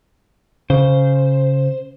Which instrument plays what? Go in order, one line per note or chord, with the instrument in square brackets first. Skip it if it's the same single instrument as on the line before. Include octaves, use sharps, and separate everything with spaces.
[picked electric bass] C#3 [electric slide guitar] C5